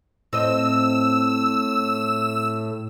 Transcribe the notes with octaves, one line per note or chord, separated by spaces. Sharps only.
A2 C4 D#5 E6